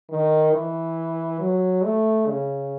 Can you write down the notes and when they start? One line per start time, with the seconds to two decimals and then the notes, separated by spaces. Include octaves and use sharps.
0.10 D#3
0.53 E3
1.40 F#3
1.84 A3
2.27 C#3